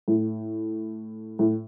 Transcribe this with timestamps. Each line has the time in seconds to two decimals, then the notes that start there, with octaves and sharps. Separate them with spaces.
0.08 A2
1.39 A2